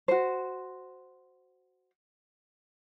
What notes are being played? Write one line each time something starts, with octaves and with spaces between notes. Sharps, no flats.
F#4 C5